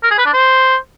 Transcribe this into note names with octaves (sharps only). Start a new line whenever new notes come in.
A#4
G#4
B4
D4
C5